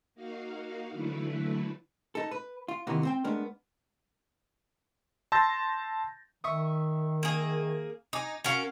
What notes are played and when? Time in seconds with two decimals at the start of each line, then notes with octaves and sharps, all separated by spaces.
0.15 A#3 D#4 F#4 F5
0.91 D3 E3 F#3 A3 E4 B4
2.15 D#4 A4
2.31 B4
2.68 F4
2.87 D#2 C3 D#3 E3 A#3 B3
3.03 C4 C5 G5
3.24 G#3 A3 B3 D4 A#4
5.32 A5 C6 E6 G6 A6 A#6
6.44 D#3 E5 C#6 D#6
7.23 A#3 G#4
8.13 D#4 G#5 D6 D#6
8.44 C#4 F#4 A#4 C#5 F5